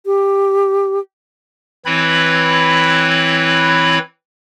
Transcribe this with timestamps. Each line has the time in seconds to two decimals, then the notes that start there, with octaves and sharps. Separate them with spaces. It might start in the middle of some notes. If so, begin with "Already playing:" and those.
0.06 G4
1.85 E3 C4 E4 B4 C#5 B5